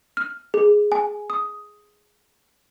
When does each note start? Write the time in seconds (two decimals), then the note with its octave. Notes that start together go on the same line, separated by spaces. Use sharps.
0.17 F6
0.54 G#4
0.92 G#5
1.30 D#6